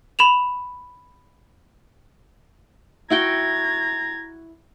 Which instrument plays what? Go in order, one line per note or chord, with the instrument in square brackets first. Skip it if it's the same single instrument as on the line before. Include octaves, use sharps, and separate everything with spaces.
[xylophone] B5 E7 F7
[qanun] E4 F#4 G5 [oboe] A#5 [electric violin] G#6